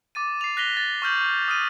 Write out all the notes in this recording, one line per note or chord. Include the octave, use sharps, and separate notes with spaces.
D6 A6 D#7
C7 F7
F#6 A#6 B6 F7 G7
A6
C#6 F6 G6 F#7
D#6 F6 D#7